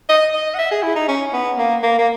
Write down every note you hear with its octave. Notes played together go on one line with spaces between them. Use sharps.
D#5
D#5
F#5
E5
G#4
E4
D#4
C#4
B3
A#3
A#3
A#3